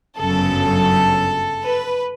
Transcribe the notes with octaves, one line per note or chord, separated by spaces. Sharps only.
G1 F#2 C#3 F#3 A4
B4